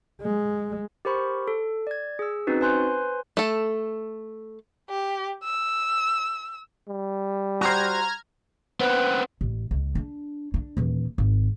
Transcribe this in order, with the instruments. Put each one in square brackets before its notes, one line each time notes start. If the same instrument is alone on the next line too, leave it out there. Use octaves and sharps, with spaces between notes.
[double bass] G#3
[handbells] G4 A#4 C5 B5 C#6
A4
D5 G#6
G#4 E6
C4 C#4 D#4 F#4 B4
B4 C5 G#5 C6 F#6 G6
[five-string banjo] A3 A4
[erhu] G4
E6
[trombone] G3
[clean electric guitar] F#4 C5 [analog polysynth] A#5 F6 G#6
[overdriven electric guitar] B3 C4 [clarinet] B4
[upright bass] A1
C#2
D4
D4
D#1 E3
G#1